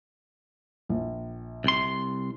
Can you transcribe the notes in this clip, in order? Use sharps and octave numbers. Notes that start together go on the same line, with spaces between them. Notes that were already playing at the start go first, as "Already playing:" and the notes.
A#1
C2 C6